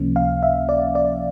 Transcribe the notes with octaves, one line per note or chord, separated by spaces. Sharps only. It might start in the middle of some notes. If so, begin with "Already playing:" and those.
Already playing: C#2 C3 F3 A#3 C#4
F5
E5
D5
D5